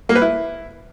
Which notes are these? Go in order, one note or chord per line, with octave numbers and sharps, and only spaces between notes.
A#3
B4
E4